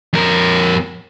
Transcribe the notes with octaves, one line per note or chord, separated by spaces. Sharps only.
F2 A#4